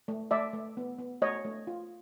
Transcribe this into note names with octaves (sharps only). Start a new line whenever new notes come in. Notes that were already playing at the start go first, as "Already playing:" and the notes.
A3
A3 D5 E5
A3
B3
B3
A3 C#5 D#5
A3
F4